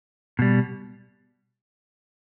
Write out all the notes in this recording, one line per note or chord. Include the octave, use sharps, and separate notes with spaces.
B2 G3